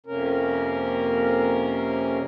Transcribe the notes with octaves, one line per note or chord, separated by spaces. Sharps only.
F2 C3 A#3 C#4 A#4